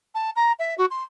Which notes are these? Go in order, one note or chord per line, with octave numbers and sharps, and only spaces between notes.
A5
A#5
E5
F#4
C6